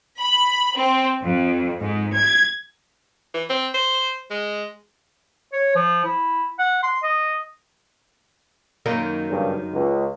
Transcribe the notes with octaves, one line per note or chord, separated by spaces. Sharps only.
B5
C4
F2
G#2
G#6
E3
C4
C5
G#3
C#5
F3
E4
F#5
C6
D#5
F#2 D#3 A#3
G2 C#3
C#2